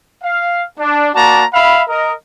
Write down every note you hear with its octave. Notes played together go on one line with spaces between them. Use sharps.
F5
D4
A#3 F#4 D5 A5 A#5
E5 F5 B5
A#4 D#5